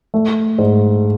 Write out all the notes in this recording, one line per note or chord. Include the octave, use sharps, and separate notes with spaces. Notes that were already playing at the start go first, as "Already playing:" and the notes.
A3
G#2